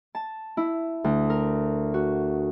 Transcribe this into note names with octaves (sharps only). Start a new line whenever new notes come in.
A5
E4
D2
A#4
F#4